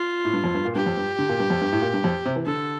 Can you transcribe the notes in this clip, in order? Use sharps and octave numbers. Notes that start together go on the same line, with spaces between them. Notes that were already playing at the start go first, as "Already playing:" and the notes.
Already playing: F4
A2
G2
F2
G2
A#2
G2 G4
F2
G2
D3
A#2
G2
F2
G2
A2
A#2
G2
F2
C3
E3
D3 A4